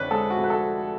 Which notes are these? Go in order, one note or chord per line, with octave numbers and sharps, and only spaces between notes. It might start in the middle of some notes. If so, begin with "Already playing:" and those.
Already playing: F1 F2 D3 B4 C#5 D5
G#3 A4
F#4
F1
B4
A4